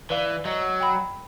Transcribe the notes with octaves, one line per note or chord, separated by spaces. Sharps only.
E3 B4 D5 F5
F#3 D#5
G5 B5